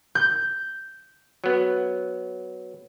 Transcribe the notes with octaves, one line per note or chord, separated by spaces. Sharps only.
G6
F#3 B3